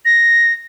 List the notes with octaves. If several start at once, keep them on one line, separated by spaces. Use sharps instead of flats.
A#6